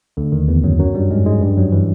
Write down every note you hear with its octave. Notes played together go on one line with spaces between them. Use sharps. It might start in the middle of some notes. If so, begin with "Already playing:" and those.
D2 D3
D#2 D#3
E2 E3
F#2 F#3
F#2 F#3
G2 G3
G#2 G#3
G#2 G#3
G2 G3
F#2 F#3
E3